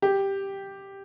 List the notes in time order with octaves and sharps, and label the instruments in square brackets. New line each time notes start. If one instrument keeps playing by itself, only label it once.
[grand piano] G4